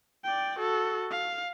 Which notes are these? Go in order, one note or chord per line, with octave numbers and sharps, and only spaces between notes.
D5 G5
F#4 A4
F5